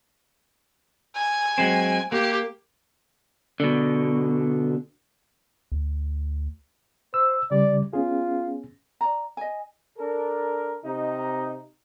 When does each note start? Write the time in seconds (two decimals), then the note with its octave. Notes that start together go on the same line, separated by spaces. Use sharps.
1.16 G#5
1.58 F#3 G#3 C4
2.12 A#3 G4
3.60 B2 D3
5.72 D2
7.14 C5 E6
7.51 C#3 G3 D5
7.93 B3 C#4 F4 G#4
9.01 D5 A#5
9.37 D#5 G#5
9.98 D4 A4 A#4
10.85 C3 D#4